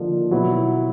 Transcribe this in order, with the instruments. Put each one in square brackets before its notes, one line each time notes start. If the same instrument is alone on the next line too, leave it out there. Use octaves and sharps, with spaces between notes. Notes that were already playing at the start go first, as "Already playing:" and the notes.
Already playing: [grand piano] D3 F3 A#3 D#4
B2 F#3 B3 E4